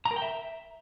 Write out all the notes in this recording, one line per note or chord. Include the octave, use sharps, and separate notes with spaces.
A#5
A#4
G5
E5